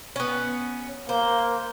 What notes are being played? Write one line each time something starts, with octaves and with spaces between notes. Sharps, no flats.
B3 C#4
A#3 C5